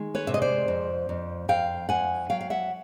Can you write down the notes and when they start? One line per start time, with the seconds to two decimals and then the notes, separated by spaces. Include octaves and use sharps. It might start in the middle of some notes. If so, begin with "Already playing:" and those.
Already playing: D#3 G#3
0.15 B4 C#5
0.27 C3 E5
0.34 D#5
0.42 C5 D5
0.68 F2
1.09 F2
1.48 F2 F5 G5
1.89 F2 F#5 G#5
2.30 F#3 F5 G5
2.41 F5
2.50 E5 F#5